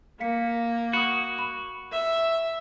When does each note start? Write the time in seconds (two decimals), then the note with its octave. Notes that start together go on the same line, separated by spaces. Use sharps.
0.20 A#3 F5 B6 C#7
0.93 F#4 B5 D#6
1.39 B5
1.92 E5